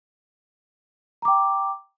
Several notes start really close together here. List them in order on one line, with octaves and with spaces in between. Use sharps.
A#5 D6 G5